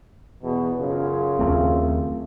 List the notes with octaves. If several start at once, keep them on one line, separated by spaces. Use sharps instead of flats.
E2 B2
F#2 C#3 F4
D#2 A3 C4